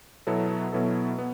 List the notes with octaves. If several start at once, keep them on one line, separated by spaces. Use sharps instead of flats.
B2 F#3 B3 E4 A4
B2 F#3 B3 E4 A4
B3